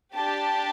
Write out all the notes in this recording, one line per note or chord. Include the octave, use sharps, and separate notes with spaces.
D4 G4 A5